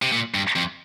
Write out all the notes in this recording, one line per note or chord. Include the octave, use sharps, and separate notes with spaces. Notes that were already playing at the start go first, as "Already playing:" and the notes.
C3
A#2
G2
F2